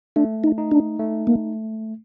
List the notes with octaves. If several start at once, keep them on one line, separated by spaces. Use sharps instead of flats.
A3 D4
D#4
D#4
D4
A3
A#3